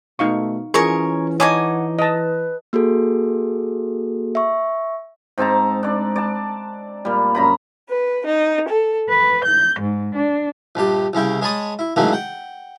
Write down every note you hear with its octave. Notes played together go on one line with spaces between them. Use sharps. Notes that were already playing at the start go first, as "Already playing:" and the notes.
B2 A3 D#4 F5 C#6
E3 C#4 F4 G#4 A#4 C#5 C#6
D#4 C#5 F#5 G#5 A5 D6 D#6
B4 D#5 A5
A#3 F#4 G#4 A4
E5 C#6
G#2 C4 A5 A#5
D4 D5
D5 A5
A#2 G3
F#2 A#5 B5
B4
D#4
A4
B4
G6
G#2
D4
A#1 G2 G4
C2 C#3 E4 G5
G#3 C#5 A5 B5 D#6
E4
G#2 C#3 E3 F#3 A3 A#3
F#5 G5